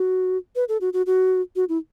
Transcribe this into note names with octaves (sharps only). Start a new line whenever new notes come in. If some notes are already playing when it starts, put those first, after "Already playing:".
Already playing: F#4
B4
A4
F#4
F#4
F#4
F#4
E4